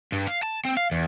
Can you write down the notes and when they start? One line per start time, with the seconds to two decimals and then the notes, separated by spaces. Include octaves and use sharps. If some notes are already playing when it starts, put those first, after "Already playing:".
0.13 G2
0.28 F5
0.43 A5
0.65 C4
0.77 F5
0.92 E2